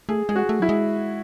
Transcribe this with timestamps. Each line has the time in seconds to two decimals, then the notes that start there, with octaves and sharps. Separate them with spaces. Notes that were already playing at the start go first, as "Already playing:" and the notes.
0.09 A3 G#4
0.29 G#3 G#4
0.36 F#4
0.49 A3
0.60 F#3 E4
0.69 G#3